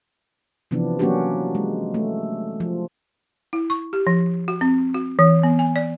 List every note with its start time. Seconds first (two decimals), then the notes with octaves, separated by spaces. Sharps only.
0.71 C3 E3 F3 B3 D4
0.99 F#3 A#3 C#4 D4 F#4 G4
1.55 G#3
1.94 A3
2.60 F3
3.53 E4
3.70 C#6
3.93 G4
4.07 F3
4.48 F#4
4.61 C4
4.94 F#4
5.19 E3
5.43 B3
5.59 G#5
5.76 D5